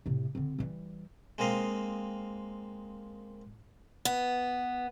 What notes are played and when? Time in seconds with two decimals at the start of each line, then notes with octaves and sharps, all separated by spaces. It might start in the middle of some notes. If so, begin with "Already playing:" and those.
0.06 A2 C3
0.35 D3 C4
0.58 E3 G3
1.38 G#3 A#3 C4 D#5 F5
4.05 B3